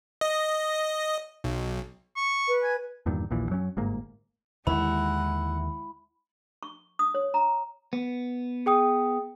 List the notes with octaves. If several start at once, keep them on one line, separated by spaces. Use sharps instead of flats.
D#5
B1
C#6
B4
G#5
E2 G2 A#2 D#3
A#1 D#2 A#2 E3
F#2 F#3 C#4
G1 G#2 A#3
D#2 D3 D#3 G#3 E4 F#5 B5
C#6
D#6
C#5
A#5
B3
G#4 G5 D#6